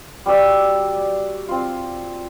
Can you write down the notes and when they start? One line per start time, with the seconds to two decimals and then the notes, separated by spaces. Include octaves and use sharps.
0.26 G3 F#4 D5 E6
1.48 C4 F4